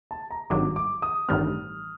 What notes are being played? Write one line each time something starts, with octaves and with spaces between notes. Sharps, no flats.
A5
A#5
G#1 G2 D#3 F#3 D6
D6
D#6
A1 G2 D#3 G3 C4 F6